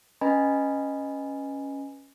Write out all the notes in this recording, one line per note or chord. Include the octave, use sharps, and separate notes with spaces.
C#4 B4 D#5 G#5 A#5 B5